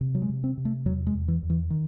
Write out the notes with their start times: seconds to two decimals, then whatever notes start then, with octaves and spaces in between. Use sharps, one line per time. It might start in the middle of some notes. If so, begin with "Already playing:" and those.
0.01 C3
0.15 F#3
0.22 G#3
0.30 C3
0.44 C4
0.57 C3
0.65 A3
0.86 E2 F#3
1.07 G#3
1.14 E2
1.28 E3
1.43 E2
1.50 E3
1.70 D#3